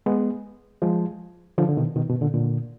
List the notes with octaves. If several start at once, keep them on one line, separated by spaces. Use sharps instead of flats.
G#3 B3
F3 G#3
D3 F3
D3
B2 D#3
B2 D#3
B2
A#2 D3
A#2 D3